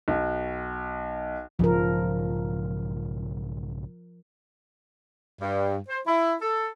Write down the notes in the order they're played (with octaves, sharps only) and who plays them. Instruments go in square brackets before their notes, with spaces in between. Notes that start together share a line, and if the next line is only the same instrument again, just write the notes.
[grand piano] B1
[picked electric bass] B1 G#2 C#3 [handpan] F3 A#4
[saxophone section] G2
C5
E4
A4